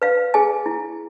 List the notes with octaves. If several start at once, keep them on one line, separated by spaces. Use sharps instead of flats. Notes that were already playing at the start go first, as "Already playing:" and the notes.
B4 F5
G#4 G#5
E4